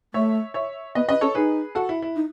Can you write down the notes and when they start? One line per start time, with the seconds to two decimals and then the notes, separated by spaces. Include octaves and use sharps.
0.14 A3 C#5 E5
0.54 C#5 E5
0.95 B3 B4 D#5
1.08 C#4 B4 D#5
1.21 C#4 A4 C#5
1.35 D#4 G#4 B4
1.75 F#4 A4
1.89 E4
2.02 E4
2.16 D#4